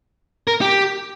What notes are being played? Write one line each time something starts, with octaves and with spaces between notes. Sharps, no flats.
A#4
G4